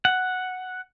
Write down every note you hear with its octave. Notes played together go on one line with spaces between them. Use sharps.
F#5